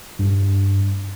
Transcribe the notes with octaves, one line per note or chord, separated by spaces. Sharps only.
G2